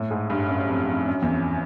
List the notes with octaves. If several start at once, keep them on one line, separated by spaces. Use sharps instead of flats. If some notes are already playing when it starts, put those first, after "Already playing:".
Already playing: A2
G#2
G2
F#2
F2
F2
F#2
E2
F2